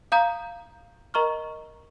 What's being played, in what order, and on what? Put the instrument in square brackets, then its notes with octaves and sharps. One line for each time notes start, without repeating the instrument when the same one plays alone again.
[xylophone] F5 A#5 D#6 G6
A#4 D#5 A#5 C#6 F6